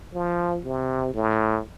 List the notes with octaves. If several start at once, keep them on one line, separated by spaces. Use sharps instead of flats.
F3
C3
A2